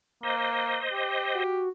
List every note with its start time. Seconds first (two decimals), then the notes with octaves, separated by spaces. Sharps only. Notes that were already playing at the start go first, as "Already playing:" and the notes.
0.23 A#3 C5 D#5
0.92 G4
1.34 F#4